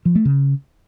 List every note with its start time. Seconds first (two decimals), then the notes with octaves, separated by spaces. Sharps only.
0.05 F3
0.15 A3
0.25 C#3